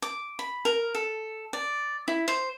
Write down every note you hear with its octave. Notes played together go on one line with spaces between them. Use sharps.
D6
B5
A#4
A4
D5
E4
C5